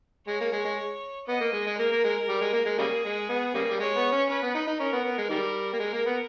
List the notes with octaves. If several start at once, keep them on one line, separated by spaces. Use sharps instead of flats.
G#3 C#5
A#3
G#3
G#3
B3 D#5
A#3
G#3
G#3
A#3 A#4
A#3
G#3
G3
G#3
A#3
G#3
C#3 G3 A#3 G#4
G#3
B3
C#3 G3 A#3
G3
G#3 C#5
B3
C#4
C#4 B4
B3
D#4
D#4
C#4 A#4
B3
B3
G#3
D#3 G3
A#3
G#3
A#3
B3